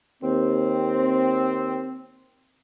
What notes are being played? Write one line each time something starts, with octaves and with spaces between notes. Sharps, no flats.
D#2 C4